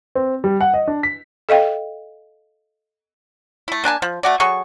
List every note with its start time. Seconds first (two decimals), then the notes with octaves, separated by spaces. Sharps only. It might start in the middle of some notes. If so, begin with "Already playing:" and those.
0.15 C4
0.44 G3
0.60 F#5
0.74 D#5
0.88 D4
1.03 B6
1.49 A4 D#5 F5 G5
3.68 A3 E4
3.84 A#3 D4 G#5 A5
4.02 F3
4.23 A3 F#4 D5
4.40 F#3 G#4 A4 C#6